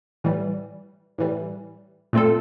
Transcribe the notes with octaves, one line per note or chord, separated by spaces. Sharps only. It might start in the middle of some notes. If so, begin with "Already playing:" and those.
A2 E3 G3
A2 E3 G3
A#2 A3 C4 F4 A4